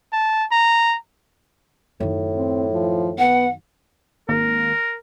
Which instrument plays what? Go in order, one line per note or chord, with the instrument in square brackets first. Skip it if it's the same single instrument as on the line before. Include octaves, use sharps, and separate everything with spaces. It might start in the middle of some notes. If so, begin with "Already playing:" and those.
[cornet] A5
A#5
[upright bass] F#2 D#3 [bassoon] A2
[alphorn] C4
F3
[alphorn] B3 [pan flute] F#5
[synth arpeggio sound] G#1 A#3 [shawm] A#4